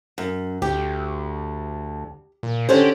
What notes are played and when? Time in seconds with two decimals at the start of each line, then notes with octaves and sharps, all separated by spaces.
0.18 F#2
0.62 D2 G4
2.43 A#2
2.69 D3 C#4 G4 C5